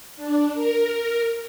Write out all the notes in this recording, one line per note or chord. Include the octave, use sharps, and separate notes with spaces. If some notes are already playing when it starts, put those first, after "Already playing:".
D4
A#4